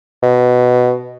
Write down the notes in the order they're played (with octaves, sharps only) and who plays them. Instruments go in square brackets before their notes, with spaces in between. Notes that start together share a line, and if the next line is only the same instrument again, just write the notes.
[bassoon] B2